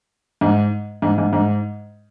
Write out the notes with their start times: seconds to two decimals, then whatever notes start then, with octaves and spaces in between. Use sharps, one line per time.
0.41 G#2
1.02 G#2
1.18 G#2
1.33 G#2